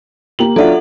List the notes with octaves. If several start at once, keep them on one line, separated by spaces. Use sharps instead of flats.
A#3 G4 F#7
F#3 D4 F4 A4 E5 F#5